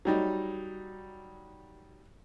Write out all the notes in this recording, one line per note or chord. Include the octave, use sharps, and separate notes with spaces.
F#3 G3 D#4